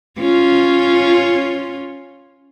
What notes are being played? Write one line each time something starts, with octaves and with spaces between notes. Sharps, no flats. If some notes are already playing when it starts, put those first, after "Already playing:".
C#4 F4